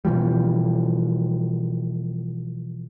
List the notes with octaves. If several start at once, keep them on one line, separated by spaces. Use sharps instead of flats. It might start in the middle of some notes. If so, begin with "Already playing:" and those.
B2 E3 F3 G3